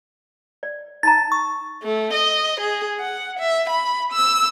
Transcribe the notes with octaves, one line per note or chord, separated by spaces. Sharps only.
D5
D#4 A5 A#5 A6
C#6
A3
D#5
G#4
F#5
E5
B5
E6